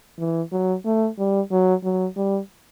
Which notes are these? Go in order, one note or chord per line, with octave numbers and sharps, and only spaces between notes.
E3
F#3
A3
G3
F#3
F#3
G3